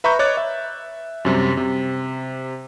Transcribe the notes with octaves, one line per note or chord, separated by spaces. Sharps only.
B4 E5 A#5 B5 C#6 G6
C#5 D#5 D6 F#6 A6
E5
F#2 C3 G3
C3